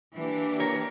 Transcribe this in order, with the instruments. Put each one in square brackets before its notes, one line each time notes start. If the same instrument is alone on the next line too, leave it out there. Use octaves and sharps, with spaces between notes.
[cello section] E3 A#3 D4 G4
[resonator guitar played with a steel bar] A#4 C#5